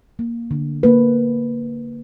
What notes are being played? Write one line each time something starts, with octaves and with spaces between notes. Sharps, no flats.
A#3
D3
A#3 B4